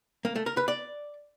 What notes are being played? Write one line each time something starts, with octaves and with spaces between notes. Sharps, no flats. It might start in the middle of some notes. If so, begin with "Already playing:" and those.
A#3
A3
A#4
B4
D5